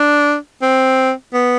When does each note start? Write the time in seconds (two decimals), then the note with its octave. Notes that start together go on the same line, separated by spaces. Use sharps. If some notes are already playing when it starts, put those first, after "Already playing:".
Already playing: D4
0.62 C4
1.34 B3